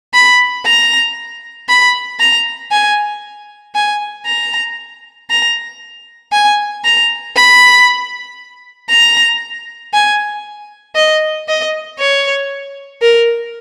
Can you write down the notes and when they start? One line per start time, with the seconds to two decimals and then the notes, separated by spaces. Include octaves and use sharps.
0.14 B5
0.66 A#5
1.69 B5
2.20 A#5
2.72 G#5
3.75 G#5
4.26 A#5
5.30 A#5
6.33 G#5
6.85 A#5
7.36 B5
8.90 A#5
9.94 G#5
10.96 D#5
11.48 D#5
11.99 C#5
13.02 A#4